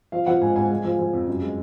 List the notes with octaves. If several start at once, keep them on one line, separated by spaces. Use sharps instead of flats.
F3 F5
F3 F#5
G#2 G#5
G#2 G#5
G#3
F3
F3
F2
F#2
G#3